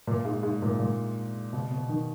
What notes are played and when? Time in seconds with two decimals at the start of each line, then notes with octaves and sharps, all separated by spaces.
0.07 A#2
0.25 G#2
0.43 G#2
0.62 A#2
0.80 A#2
1.53 B2
1.71 B2
1.89 D#3